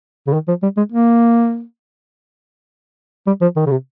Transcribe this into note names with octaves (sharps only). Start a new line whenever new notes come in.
C#3
D#3
F3
G3
G#3
A#3
G3
F3
D#3
C#3
C3